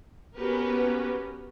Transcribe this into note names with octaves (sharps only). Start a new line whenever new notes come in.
B3 C#4 F#4 G4 A#4 B4